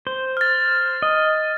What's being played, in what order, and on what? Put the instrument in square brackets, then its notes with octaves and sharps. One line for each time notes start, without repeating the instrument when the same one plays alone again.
[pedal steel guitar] C5
[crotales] F6 A6
[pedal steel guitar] D#5